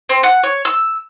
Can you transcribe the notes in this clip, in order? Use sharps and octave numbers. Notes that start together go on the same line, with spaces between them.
C4
F#5
C#5
E6